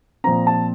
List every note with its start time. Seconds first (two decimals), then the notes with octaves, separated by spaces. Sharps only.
0.24 A#2 F3 C4 A#5
0.47 A5